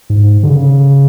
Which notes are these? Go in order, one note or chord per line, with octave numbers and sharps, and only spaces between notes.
G#2
D3
C#3